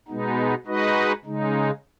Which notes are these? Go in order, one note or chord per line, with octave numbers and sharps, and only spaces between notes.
B2 G#3 B3 D#4
G#3 D#4 F#4 B4 D#5
C#3 G#3 D#4